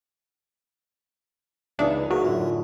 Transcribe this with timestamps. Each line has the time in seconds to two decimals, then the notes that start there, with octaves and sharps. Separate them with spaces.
1.79 C#2 E3 B3 D4 D#4 E5 F5
2.10 F#3 A#3 G#4 C#6
2.24 F#2 A2 D3 F4